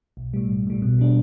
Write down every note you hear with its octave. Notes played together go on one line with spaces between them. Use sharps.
B1
A2 G3
B1
A2 G3
B2
G3 D4